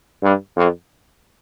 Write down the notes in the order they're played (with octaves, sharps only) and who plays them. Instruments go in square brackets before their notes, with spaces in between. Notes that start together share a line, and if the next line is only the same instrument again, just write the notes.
[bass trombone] G2
F2